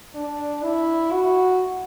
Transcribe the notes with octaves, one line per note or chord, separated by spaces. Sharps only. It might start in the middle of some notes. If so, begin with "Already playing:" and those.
D4
E4
F#4